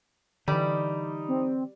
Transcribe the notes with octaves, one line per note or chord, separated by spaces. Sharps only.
D3 E3 G3 D#4 B5 D6
C4